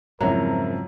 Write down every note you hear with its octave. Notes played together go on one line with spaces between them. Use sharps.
F2 G#2 C#3 F#3 C4 E4 A#4 A#5